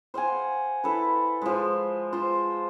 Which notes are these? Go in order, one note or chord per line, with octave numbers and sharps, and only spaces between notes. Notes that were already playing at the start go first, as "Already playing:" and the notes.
C5 F5 F#5 G#5
E4 A4 B4
F3 G#3
F4 C5